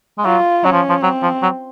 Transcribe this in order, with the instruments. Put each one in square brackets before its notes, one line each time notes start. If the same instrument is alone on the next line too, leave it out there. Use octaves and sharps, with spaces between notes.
[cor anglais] G#3
[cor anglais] F#3 [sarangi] F4
[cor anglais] F#3 [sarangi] C#4
[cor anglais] F3
F3
[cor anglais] F#3 [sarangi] C4
[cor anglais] F3
F#3